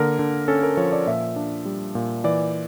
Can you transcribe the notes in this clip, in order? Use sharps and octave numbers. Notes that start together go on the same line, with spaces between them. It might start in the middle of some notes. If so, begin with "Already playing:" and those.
Already playing: D3 A#3 A#4
D3
C#4 A4
A#4
F3 C#5
D5
A#2 E5
D4
G3
A#2
E3 D5